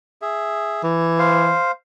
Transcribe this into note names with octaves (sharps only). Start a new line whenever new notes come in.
G#4 E5
E3
C5 F5